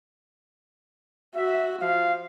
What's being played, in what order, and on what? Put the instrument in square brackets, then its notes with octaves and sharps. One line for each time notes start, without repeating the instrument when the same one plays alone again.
[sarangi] F#4 [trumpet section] E5
[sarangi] F3 [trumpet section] F4 F5